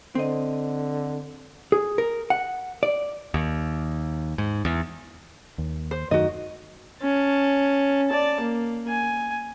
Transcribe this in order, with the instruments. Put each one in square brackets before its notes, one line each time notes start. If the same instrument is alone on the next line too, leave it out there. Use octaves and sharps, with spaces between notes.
[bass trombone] D3 [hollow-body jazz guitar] C4 D#5
[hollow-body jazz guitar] G#4
A#4
F#5
D5
[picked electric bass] D#2
G#2
E2
D#2
[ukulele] C5
[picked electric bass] F#2 D#3 A3 [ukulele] F#4 D#5
[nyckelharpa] C#4 A5
D5 A5
A#3
G#5